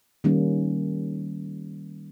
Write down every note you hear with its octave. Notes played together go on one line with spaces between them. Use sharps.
D#3 G3 A#3 C#4